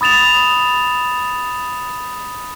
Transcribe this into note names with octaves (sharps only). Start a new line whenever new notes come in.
B5 D#6 A6 E7 F7